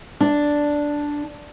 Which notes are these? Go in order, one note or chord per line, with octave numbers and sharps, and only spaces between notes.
D4